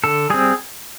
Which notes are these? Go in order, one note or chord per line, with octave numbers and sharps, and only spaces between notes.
D3 A4
G3 C4 G#4